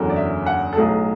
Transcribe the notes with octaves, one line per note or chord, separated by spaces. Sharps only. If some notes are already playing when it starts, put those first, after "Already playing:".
Already playing: F#1 E2 D3 F#3
D5
E5
F#5
A4
B1 A2 F#3 G#4